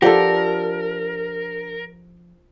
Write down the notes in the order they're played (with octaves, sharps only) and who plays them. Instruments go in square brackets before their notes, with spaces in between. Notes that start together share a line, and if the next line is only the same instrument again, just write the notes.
[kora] F3 D4 A4 [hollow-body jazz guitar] G4 F#5 [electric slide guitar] A#4